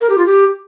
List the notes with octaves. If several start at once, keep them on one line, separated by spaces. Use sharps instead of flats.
A#4
G4
F4
G4